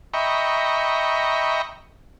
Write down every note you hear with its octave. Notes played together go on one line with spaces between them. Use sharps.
D#5 E5 G5 A#5 B5 C#6